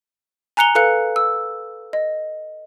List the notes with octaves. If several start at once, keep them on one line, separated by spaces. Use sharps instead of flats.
G#5 A#5 F#6 C#7 F7 G7
A4 B4 F5 F#6 C#7
E6
D#5